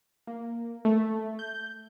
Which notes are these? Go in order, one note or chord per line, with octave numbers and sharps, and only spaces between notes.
A#3
A3
G6